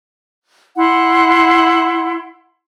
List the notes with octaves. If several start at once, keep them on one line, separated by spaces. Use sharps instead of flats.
E4 F#5 C6